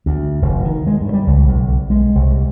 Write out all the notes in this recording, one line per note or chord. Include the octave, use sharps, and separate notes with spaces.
D2
F1
D#3
G#3
G2
G3
C#2
B1
G#3
C2